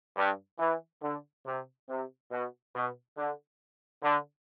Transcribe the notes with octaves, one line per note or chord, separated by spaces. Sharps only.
G2
E3
D3
C3
C3
B2
B2
D3
D3